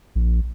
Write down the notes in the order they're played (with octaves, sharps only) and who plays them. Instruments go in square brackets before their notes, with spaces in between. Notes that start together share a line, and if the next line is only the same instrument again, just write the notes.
[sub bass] A#1